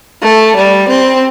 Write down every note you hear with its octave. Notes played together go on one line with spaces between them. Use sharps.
A3
G3
C4